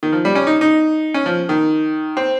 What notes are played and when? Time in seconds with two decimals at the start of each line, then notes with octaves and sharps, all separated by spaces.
0.03 D#3
0.12 F3
0.25 G3
0.35 C#4
0.47 D#4
0.61 D#4
1.14 C#4
1.26 F3
1.49 D#3
2.17 C4